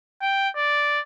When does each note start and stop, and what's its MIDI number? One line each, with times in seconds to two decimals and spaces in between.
0.22 0.49 79
0.56 1.00 74